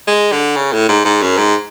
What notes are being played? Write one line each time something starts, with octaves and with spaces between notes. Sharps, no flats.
G#3
D3
C#3
A2
G#2
G#2
F#2
G#2